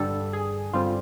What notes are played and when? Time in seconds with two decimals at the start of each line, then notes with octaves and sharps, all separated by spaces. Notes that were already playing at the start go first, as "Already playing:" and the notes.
Already playing: G2 D3 G3 A4
0.33 G#4
0.73 G2 D3 G3 C4 F4